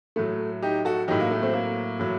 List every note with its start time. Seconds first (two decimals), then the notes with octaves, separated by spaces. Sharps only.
0.16 A2 F#3 A3
0.63 D#4 G4
0.85 F#4 A4
1.08 A2 F#3 D#4 G4
1.20 A#3
1.31 A3
1.42 A3 C4
1.53 A#3
2.00 A2 F#3